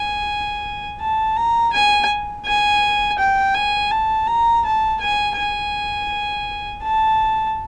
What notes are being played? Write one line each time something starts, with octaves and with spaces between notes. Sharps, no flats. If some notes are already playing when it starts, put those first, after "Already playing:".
Already playing: G#5
A5
A#5
G#5
G#5
G5
G#5
A5
A#5
A5
G#5
G#5
A5